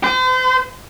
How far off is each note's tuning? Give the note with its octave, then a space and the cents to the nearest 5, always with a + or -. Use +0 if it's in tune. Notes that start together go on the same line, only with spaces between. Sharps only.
C5 -40